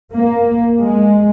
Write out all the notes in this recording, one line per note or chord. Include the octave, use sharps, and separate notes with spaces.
A#3
G#3